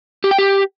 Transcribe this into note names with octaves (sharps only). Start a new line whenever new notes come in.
G4
G5
G4